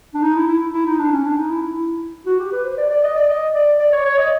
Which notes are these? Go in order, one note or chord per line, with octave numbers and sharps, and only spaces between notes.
D4
D#4
E4
E4
E4
D#4
D4
C#4
D4
D#4
E4
E4
F#4
G4
B4
C5
D5
D5
D#5
D5
D#5
D5
D5
C#5
C#5
D#5